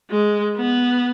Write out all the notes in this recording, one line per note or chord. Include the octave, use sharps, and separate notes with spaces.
G#3
B3